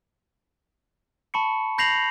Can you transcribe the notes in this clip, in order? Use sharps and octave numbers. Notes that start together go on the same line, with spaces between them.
A5 B5 C#6 C#7
B5 G6 A#6 C7 F7 F#7